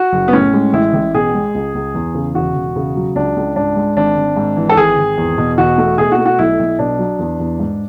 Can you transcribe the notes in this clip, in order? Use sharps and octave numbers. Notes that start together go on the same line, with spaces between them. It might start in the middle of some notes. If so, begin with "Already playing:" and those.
Already playing: F#4
F#1
B3
A2 C#4
G#3
A1 E4
A1
B2 G#4
G#3
C#2
C#2
E2
C#3
E1 F#4
E1
C#3
F#3
C#2 D4
C#2
G#2 D4
G#3
G#1 D4
G#1
G#2
E3
A4
G#1 G#4
G#1
E2
B2
E1 F#4
A3
B2 G#4
F#4
A3
F#4
B1 E4
B1
B2 D4
F#3
E2
E2
G#2